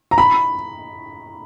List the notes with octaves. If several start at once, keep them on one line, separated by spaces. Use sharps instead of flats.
A#5
B5